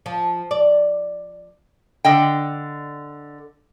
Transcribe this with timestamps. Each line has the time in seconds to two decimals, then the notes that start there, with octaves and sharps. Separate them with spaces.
0.06 F3
0.51 D5
2.05 D3 D#5 G5